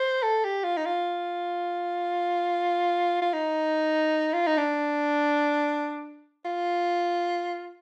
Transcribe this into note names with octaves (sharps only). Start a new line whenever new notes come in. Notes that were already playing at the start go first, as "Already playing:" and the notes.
Already playing: C5
A4
G4
F4
D#4
F4
F4
D#4
F4
D#4
D4
F4